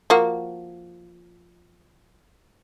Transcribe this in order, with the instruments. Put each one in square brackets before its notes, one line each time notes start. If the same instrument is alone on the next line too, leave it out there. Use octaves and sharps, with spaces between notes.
[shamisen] F3 A#3 F#4